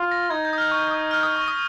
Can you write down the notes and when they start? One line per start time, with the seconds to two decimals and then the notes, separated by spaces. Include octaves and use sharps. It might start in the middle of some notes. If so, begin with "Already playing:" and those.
Already playing: F4
0.11 A#6
0.31 D#4 G#6
0.45 G6
0.53 D#6
0.58 F6
0.71 C#6
0.91 D#6
1.11 F6
1.23 D#6
1.36 C#6
1.48 D#6